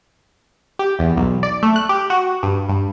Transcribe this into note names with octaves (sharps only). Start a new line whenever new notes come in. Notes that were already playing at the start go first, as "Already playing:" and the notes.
G4
E2
B1
D5
A3
F#6
G4
F#4
G2
G2